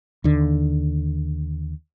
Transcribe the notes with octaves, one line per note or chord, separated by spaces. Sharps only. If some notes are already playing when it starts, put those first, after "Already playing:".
D#2 D3